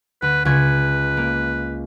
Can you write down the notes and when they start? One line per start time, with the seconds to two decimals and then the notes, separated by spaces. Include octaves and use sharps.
0.22 D2 B4
0.45 C#2 B4 C#6 G#6
1.17 A#3